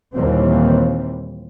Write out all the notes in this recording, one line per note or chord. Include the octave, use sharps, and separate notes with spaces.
D#2 A#2 E3 G3 C4